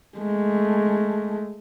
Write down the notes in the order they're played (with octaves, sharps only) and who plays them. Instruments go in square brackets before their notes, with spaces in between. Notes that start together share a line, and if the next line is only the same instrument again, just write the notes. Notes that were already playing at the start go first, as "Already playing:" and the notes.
[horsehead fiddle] G#3 A3